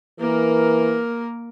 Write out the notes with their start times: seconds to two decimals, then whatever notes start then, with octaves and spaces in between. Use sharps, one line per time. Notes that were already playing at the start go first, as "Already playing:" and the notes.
0.20 E3 A#3 A#4